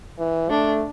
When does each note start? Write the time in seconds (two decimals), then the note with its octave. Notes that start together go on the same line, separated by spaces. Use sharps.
0.19 E3
0.50 A3 D4